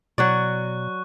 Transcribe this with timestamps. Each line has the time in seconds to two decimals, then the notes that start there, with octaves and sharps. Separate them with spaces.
0.18 B2 F#3 F#4 D5 C#6 F#6